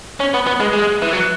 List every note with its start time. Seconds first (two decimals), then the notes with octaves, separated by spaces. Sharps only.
0.20 C#4
0.34 B3
0.47 B3
0.60 G#3
0.73 G#3
1.02 E3
1.13 F#3